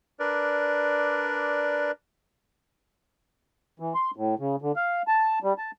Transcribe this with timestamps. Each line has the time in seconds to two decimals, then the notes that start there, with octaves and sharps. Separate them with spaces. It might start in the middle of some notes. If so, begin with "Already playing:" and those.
0.19 D4 A#4 B4 D5
3.80 E3
3.95 C6
4.16 A2
4.39 C#3
4.62 D3
4.76 F5
5.08 A5
5.43 G3
5.58 A5